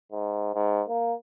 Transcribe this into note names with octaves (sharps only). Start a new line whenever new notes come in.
G#2
G#2
A#3